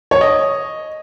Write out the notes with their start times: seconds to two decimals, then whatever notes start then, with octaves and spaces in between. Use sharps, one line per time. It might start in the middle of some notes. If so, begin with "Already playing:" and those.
0.11 C#5
0.21 D#5